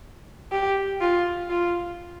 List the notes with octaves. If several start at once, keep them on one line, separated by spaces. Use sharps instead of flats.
G4
F4
F4